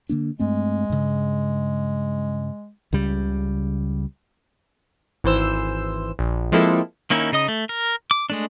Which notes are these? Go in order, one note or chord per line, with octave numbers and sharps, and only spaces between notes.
D3 A#3 D4
G2 G#3 A3 C4
G2 C#3
C#2 C#3 G3
G#1 E3 C5 E6
A#1
F3 G#3 A#3 C4 E4 A4
D#3 A#3 C#4 D#4 E4
C#3 D#4 D#5 D#6
A3
A#4
D6
G#3 A3 D4